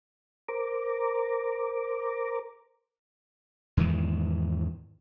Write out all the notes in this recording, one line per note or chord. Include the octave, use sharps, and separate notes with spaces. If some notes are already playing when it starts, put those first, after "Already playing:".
A#4 C5 A#5 D6
E2 G#2 D#3 E3